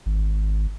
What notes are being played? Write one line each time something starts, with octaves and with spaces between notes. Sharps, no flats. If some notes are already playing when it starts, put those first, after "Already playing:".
G#1